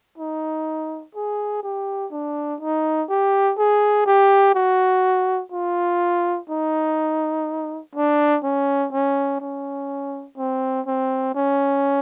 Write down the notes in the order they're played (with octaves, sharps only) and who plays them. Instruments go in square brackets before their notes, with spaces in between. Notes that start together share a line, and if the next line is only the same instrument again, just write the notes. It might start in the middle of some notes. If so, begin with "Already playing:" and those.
[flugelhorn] D#4
G#4
G4
D4
D#4
G4
G#4
G4
F#4
F4
D#4
D4
C#4
C#4
C#4
C4
C4
C#4